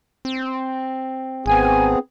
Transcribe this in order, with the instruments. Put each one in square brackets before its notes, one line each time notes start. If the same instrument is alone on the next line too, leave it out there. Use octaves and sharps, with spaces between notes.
[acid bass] C4
[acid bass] G#1 [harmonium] B3 C4 G#4 [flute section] G#5